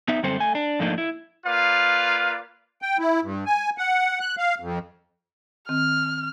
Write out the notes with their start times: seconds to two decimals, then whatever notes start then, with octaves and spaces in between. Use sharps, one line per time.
0.08 B3 D#4 E5
0.23 F#2 D3 G3 C4 A4 C5
0.37 A3 G#5
0.55 D4
0.79 G#2 F3 A3 A#3 D4 D#4
0.98 E4
1.46 A#3 F4 B4 D5 F5
2.82 G5
2.99 E4
3.23 G2
3.46 G#5
3.78 F#5
4.20 F#6
4.38 F5
4.60 F2
5.69 D#3 C4 F6